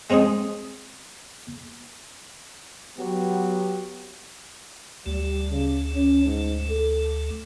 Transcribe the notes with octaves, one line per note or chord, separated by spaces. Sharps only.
G#3 C4 C#4 D#4 G#4
F#3 B3 G4
D2 G3 A3
C#3
C#4
G#2
A4